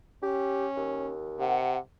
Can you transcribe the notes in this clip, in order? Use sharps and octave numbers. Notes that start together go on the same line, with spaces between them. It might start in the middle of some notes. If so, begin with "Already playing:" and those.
C#4 G4
D#2
C3 F#5